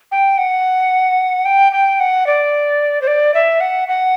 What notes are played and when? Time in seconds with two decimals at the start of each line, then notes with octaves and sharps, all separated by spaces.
0.12 G5
0.38 F#5
1.45 G5
1.72 G5
2.00 F#5
2.27 D5
3.02 C5
3.07 D5
3.34 E5
3.61 F#5
3.88 F#5